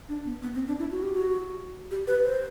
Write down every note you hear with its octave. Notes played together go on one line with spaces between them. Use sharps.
D4
B3
B3
C4
D4
E4
F#4
G4
F#4
G4
B4
C5